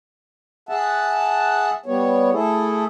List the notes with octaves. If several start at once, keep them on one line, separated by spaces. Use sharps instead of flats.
G#4 E5 F#5 A5
G3 B3 C#5
A3 E4 G#4 A4